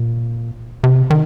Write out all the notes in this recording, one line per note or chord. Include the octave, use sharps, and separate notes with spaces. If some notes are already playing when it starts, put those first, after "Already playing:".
Already playing: A#2
C3
D#3